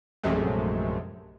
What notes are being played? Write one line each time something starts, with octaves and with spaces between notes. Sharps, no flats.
A#1 F#2 C3 G#3 A3